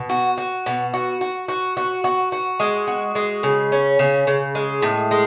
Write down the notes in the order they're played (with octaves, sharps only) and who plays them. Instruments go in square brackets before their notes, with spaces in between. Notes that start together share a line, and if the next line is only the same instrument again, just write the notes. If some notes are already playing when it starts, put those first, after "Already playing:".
Already playing: [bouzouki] B2
F#4
F#4
B2
F#4
F#4
F#4
F#4
F#4
F#4
G#3
F#4
G#3
C#3
C#4
C#3
C#3
G#3
A2
G#3